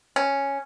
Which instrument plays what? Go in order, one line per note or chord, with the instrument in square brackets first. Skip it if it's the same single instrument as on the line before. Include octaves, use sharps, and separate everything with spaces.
[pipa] C#4